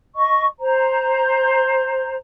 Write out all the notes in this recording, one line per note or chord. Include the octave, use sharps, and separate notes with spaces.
D#5 C#6
C5 A#5